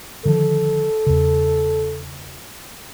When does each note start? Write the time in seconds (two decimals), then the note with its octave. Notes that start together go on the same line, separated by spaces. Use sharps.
0.25 D3 D#3 F3 A4
1.07 E2 C#3